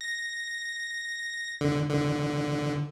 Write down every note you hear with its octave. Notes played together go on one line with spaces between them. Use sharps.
A#6
D3
D3